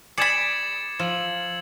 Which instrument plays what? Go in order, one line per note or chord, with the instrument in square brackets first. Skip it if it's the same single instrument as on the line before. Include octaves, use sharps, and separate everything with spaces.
[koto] G#4 [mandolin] D5 B5 [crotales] G#6 A6 C7 [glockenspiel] C#7 E7
[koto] F3 [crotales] E6 F#7